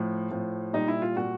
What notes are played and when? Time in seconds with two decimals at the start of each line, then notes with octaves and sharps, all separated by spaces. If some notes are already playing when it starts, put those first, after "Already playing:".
Already playing: A2 F3
0.31 A2 F3
0.73 A#2 G3 D#4
0.88 E4
1.02 F4
1.17 A#2 G3 F#4